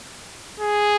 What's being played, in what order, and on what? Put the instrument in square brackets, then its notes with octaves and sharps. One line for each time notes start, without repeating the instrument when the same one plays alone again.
[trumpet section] G#4